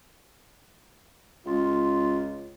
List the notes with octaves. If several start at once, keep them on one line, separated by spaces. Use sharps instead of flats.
C#2 F4